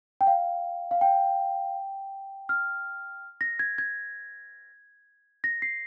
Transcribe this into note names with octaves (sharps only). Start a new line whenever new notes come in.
G5
F5
F5
G5
F6
A#6
G#6
G#6
A#6
C7